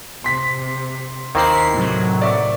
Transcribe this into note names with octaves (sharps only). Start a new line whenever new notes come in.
C3 C6 B6
D#2 D#3 A#3 C4 E4 C7
A2 C3 F#3
D5 E5 C#6